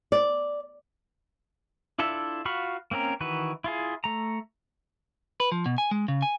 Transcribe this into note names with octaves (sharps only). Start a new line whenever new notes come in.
D5
D4 E4 F4 A4 E5
F4 F#4 F5 B5 C#6
A#3 C4 C#4 A#4
D#3 E3 F#4 B4
E4 F4 G#4
A3 A#5
B4
F3
B2
G#5
G#3
C#3
G#5